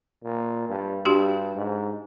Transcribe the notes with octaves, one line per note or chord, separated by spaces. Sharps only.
A#2
G2
G2 D4 F#4 G4
G#2